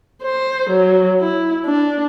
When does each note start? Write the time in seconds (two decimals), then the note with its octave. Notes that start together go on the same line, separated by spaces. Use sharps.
0.23 C5
0.70 F#3
1.20 E4
1.66 D4